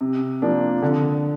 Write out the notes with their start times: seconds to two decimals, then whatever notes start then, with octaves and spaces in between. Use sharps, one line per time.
0.01 C3
0.42 F3 A#3 D4
0.82 D3